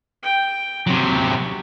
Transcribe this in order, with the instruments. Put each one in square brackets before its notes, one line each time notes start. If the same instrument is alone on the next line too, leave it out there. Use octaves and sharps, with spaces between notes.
[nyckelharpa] G5
[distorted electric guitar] C3 F#3 [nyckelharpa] G4 C#6